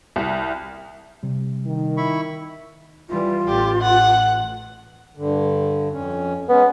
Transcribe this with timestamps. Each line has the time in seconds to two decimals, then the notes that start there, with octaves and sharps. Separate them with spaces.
0.16 C2
1.23 C3 G3
1.66 D#3
1.97 E4 B5 C#6
3.09 E3 G3 F4
3.48 A1 G4
3.81 F#5
5.17 G2 D3
5.92 F2 C#4
6.49 G#3 B3 C#4